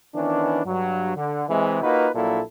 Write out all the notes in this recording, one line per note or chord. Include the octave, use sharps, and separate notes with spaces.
D#3 E3 B3 C#4 D4
G2 F#3
D3
C3 E3 G#3
A#3 D#4 F4 F#4 B4
A#1 A#2 F#3 A#3 E4 A4